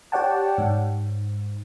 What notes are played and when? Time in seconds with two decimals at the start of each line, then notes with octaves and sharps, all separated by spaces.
0.12 G4 C#5 D5 F#5 G5 A5
0.58 G#2